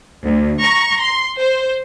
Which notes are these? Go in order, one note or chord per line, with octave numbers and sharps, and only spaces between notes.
D2
A#5 C#6
C6
C5